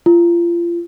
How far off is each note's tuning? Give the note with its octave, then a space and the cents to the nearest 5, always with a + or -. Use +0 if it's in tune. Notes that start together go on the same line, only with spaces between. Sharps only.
F4 -30